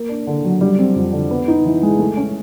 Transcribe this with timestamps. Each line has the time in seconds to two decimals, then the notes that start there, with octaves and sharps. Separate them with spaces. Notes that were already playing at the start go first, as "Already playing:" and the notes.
Already playing: A#3
0.09 D4
0.27 D3
0.44 F#3
0.61 G3
0.79 C4
0.96 F2
1.13 D3
1.31 B3
1.48 D#4
1.66 E3
1.83 G#3
1.99 A3
2.17 C#4